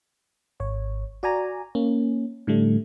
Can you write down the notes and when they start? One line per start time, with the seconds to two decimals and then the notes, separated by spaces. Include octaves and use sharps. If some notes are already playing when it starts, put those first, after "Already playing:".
0.60 G#1 C#5
1.23 F#4 D5 G#5 A#5
1.75 A#3 C#4
2.47 A2 D3 G3 A3